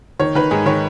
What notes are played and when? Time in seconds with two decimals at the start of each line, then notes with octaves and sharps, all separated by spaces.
0.19 D#3 C#5
0.35 D#3 B4
0.51 G#2 G#4
0.66 D#3 C#5